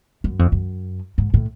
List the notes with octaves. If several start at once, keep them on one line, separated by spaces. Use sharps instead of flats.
F#2
F2
F#2
G#2
A2